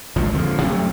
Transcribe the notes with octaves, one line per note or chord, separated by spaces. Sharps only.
G#1 C#2 A2 F3
F2 D3 E3 F3
C3 F#3 G3 A3